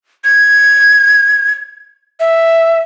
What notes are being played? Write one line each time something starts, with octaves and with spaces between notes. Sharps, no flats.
G#6
E5